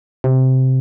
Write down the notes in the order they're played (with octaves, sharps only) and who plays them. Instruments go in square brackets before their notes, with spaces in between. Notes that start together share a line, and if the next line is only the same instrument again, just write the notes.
[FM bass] C3